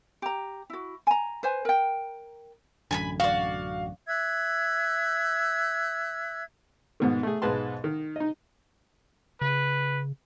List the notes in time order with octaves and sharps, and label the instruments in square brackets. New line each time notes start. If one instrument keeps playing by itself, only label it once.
[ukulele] G4 A#5
E4 F#4
G#5 A#5
B4 C5 G#5
A#4 G5
[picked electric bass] A1 F#2 D3 [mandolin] G#5 A5 B5
[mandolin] F#4 D5 [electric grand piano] F5
[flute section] E5 E6 F#6 G#6
[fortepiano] G#2 B2 D#3
A3 G#4
B1 G#2 G#3 B4 A5 C6
D#3
D#4 D#5
[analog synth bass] C#3 [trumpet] B4